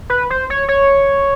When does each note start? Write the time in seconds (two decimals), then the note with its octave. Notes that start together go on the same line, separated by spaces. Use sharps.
0.10 B4
0.30 C5
0.50 C#5
0.68 C#5